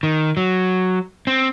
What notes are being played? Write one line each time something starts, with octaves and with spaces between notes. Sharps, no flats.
D#3
F#3
C4